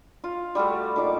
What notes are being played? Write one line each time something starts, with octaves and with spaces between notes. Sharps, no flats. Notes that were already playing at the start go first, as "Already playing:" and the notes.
F4
G3 A3 F#4 A4
A#2 D#4 D6